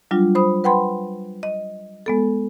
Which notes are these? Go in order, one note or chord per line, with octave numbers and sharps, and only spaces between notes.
F#3 G3 D4 F4
C5 B5 D#6
B4 F#5 G5 B5 C6
D#5
G#3 B3 A4